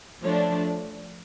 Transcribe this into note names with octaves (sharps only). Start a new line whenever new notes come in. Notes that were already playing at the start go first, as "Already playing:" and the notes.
F3 A3 D4 C#5